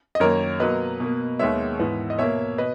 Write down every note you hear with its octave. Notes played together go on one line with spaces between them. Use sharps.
D#5
F#2 D#3 A#3 A#4 C#5
B2 F#3 A#3 B4 D#5
B2 A#3
D#2 D#3 G#3 B3 C#5 E5
G#2 E3 B3
D#5
B2 A#3 C#5 E5
B2 B4 D#5